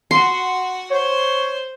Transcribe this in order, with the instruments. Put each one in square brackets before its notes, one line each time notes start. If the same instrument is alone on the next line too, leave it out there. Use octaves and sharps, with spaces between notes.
[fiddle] F#4 F#5 [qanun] C6
[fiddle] C5 [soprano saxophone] C#5